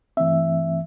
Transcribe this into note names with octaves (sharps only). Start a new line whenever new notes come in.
G2 E3 A3 C4 E5